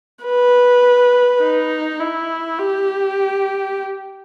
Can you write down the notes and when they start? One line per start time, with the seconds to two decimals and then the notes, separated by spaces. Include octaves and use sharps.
0.24 B4
1.42 D#4
2.00 E4
2.59 G4